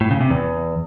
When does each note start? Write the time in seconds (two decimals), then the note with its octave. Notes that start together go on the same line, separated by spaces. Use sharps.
0.01 A2
0.11 C#3
0.21 C3
0.30 E2